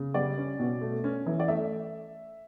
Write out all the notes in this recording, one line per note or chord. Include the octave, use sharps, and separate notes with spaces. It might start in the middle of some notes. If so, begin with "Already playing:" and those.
Already playing: C#3
G3 D5
C#4
B2
A3
C#4
E3
D5
A3 E5